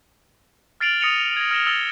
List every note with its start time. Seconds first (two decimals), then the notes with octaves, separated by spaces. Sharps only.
0.80 F6 A6 C7 D7 F7 F#7
1.00 D#6 A#6 C#7 D#7 F7 G7
1.17 F7
1.36 G#6 A#6
1.51 F6 A#6 E7 G7
1.67 E6 A6 F7 G7